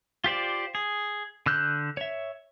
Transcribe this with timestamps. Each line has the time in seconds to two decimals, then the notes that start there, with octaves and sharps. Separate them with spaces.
0.24 F4 G4 C5 D5
0.75 G#4
1.46 D3 E6 F#6 G6
1.97 C#5 E5